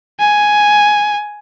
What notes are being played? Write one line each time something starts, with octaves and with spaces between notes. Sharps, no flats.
G#5